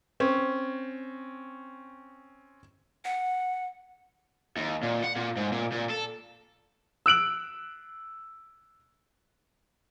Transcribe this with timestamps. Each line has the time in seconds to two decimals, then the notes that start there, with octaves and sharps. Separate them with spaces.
0.20 C4 C#4
3.05 F#5
4.56 D#2
4.83 A#2
5.04 F#5
5.16 A#2
5.37 G#2
5.52 A#2
5.72 A#2
5.89 A4
7.06 E6 F#6 D7 F#7